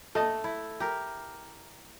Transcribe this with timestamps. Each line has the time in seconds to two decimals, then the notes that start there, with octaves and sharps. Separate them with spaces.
0.15 A3 A4 D#5 A5
0.44 E4
0.80 G4 A#4